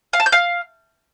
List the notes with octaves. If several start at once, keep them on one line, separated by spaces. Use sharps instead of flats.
F5
A5
G6
F5